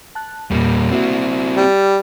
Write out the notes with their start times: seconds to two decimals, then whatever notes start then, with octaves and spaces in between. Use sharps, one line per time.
0.15 A5 F#6
0.51 E2 A#2 G3 A#3
0.91 A#3 C4 E4 F#4
1.57 G3